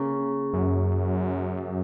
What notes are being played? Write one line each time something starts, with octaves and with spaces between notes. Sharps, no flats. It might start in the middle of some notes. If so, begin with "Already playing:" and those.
Already playing: C#3 A#3 C#4
F#2